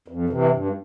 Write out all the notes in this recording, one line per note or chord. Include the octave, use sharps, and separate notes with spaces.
F2
C3 E3
G2